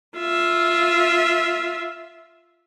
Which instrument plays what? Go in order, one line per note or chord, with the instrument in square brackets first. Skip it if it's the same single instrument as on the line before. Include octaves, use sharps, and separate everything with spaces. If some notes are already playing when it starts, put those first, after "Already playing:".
[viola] F4 E5